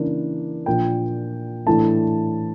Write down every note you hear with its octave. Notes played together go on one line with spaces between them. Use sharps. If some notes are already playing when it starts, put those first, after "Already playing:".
Already playing: C#3 E3 A#3 D4
A#2 F3 A#3 D4 G5
A2 E3 A3 D4 A5